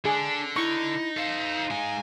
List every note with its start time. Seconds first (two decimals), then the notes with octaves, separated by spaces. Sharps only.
0.05 D3 D4 G#4
0.56 D#4 E4 C#6
1.17 A4 C5 F5
1.71 G#3 D#4 G#5